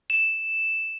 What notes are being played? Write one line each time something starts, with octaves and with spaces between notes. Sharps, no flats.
E7